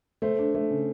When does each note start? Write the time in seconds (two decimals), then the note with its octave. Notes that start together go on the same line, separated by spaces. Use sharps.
0.22 A3 C5
0.39 D4
0.55 A3
0.70 C#3